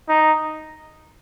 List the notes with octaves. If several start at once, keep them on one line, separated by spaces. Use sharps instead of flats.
D#4